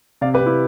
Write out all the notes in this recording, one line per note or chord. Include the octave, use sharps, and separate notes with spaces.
C3 D5 F5
G4 B4
C3
E4 G4